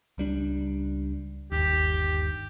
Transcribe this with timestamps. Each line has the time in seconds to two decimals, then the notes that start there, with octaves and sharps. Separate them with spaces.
0.18 C#2 G3 D4
1.52 G1 D#2 G4